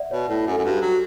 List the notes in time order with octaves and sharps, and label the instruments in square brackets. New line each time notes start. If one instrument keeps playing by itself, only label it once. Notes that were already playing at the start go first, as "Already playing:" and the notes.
Already playing: [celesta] D5 E5 F#5
[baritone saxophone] B2 [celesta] C#5
[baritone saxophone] A2 [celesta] B4
[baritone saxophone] F#2
[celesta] A4
[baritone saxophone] F#2
[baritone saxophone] G2 [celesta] F#4
[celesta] G4
[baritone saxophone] F#3